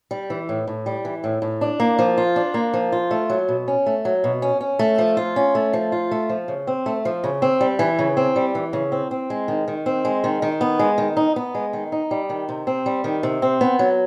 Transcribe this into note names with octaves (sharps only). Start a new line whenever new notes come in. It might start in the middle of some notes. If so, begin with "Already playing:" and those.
G3
E3
A2
A2
G3
E3
A2
A2
D4
A#3
F3
F4
D4
A#3
F3
F4
A3
F#3
B2
C#4
A3
F#3
B2
C#4
C#4
A3
F3
F4
C#4
A3
F3
F4
A3
F3
C#3
C4
A3
F3
C#3
C4
G3
E3
C#3
C4
G3
E3
C#3
C4
C4
G#3
D#3
D#3
C4
G#3
D#3
D#3
B3
G#3
D#3
D#4
B3
G#3
D#3
D#4
G3
D#3
C3
C4
G3
D#3
C3
C4
B3
F#3